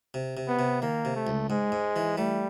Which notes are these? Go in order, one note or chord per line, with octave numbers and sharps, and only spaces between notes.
C3
C3
B3
C3
D#3 A#3
C3
A3
C#2
G#2 G#3
G#2
E3
G3 A3